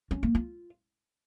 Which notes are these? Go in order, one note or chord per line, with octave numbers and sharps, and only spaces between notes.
C#4
A#3
F4